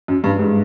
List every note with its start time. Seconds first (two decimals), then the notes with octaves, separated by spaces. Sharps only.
0.08 F#2
0.24 G2
0.39 G#2